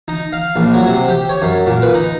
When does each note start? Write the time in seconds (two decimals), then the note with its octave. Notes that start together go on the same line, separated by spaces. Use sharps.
0.08 D#4
0.33 F5
0.56 A#1
0.74 F#3
0.87 C3
1.08 G4
1.29 C#5
1.42 F#2
1.66 A#2
1.82 B4
1.95 D#4